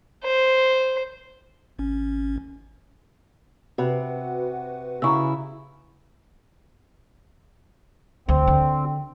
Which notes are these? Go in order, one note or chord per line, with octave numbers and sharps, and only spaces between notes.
C5
G#1 C#4
C3 F#4 B4 F#5
C#3 E4 A#5 C#6 E6
D2 C4
D3